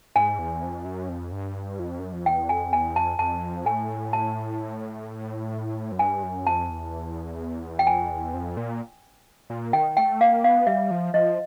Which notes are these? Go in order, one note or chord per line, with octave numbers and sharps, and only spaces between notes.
G#2 G#5
E2
F2
F#2
F2
G2
F2
F#2
F2
E2 G5
F2 G#5
E2 G#5
F2 A5
F2 A5
A2 G#5
A5
F#2
G2 G#5
F#2
F2 A5
E2
G5
F2 G#5
E2
F2
A#2
A#2
D#3 G5
A3 G5
A#3 F5
B3 F5
G3 E5
F3
F3 D#5